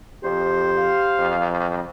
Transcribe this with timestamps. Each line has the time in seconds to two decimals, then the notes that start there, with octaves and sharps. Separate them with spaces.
0.24 F2 G4 C5
0.77 F5
1.19 F2